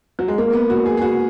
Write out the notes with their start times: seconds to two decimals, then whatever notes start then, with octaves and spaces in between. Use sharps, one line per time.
0.19 F#3
0.28 G#3
0.38 A#3
0.53 B3
0.70 F#4
0.86 G#4
0.97 G#4
1.02 F#4